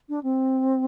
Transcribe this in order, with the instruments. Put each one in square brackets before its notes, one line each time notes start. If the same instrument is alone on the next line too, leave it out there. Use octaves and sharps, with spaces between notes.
[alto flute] D4
C4